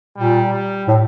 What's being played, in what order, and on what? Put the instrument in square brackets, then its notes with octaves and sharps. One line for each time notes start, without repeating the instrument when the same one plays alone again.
[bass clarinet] A#2 [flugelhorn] G3
[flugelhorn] G3
[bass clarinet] A2